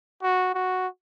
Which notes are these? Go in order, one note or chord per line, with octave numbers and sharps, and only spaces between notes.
F#4
F#4